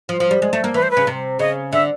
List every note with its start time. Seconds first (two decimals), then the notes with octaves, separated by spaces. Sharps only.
0.09 F3
0.20 F3
0.31 G3
0.42 G#3
0.53 A3
0.64 A#3
0.74 E3 B4
0.83 C5
0.91 B4
0.97 C#3
1.07 C3
1.39 C#3 D#5
1.73 D3 E5